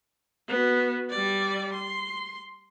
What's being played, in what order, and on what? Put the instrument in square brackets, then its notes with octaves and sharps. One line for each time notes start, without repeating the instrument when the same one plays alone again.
[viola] B3 F#4
G3 D5
C6